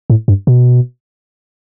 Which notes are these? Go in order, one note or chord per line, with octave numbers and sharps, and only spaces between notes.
A2
G2
B2